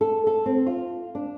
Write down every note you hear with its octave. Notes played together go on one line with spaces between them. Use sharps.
A4
A4
C4
F4
D4